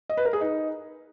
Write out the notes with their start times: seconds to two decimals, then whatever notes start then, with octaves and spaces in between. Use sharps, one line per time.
0.09 D#5
0.17 B4
0.25 A#4
0.33 G#4
0.41 D#4